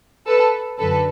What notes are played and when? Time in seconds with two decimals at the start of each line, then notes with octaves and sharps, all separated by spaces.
0.26 A4 B4
0.79 F#2 D3 A4 B4